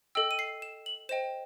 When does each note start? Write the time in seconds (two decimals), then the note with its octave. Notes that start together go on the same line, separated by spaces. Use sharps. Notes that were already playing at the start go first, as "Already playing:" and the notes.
0.15 A4 D#5 G5 E6
0.31 D#7
0.39 C7
0.62 E7
0.86 F#7
1.09 C5 D#5 G5 E7